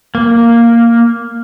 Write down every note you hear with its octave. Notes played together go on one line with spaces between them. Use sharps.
A#3